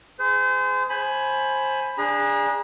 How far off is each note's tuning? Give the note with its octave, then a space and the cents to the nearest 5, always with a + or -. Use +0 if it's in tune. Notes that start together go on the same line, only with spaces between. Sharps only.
G#4 +0 C5 -35
C5 +20 G#5 +15 B5 +5
D4 +0 G#4 -25 A#5 +40